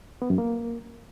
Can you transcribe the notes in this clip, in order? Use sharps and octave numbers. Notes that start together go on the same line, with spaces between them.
B3
F#2
A#3